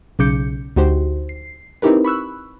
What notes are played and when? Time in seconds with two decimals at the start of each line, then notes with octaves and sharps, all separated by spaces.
0.19 B1 C#3 D6 G6 C#7
0.76 D2 D#4 F#4 G4 C5
1.29 C7
1.82 C4 D#4 E4 G4 A#4 B4
2.05 B5 C#6 E6 F#6